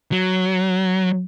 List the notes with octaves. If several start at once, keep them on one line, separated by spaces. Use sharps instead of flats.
F#3